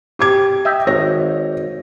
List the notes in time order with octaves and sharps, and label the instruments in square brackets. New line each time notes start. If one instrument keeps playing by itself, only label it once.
[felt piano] G4 D6 G#6
[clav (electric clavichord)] D#5 E5 G5
[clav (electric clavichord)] G#1 [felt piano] C#5 A#6